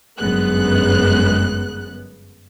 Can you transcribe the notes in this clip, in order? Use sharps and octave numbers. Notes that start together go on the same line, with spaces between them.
G1 F#2 G#3 B3 F#6